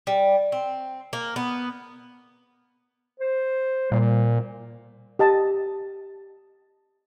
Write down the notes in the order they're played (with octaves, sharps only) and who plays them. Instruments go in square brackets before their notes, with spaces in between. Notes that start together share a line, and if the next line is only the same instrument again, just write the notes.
[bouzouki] G3
C4
A#3
B3
[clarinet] C5
[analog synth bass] A#2 [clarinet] G3
[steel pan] G4 D#5 A5